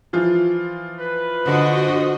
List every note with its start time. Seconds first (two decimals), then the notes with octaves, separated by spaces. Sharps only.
0.13 E3 F3 F4
0.99 B4
1.46 D3 F#4 C5 D#5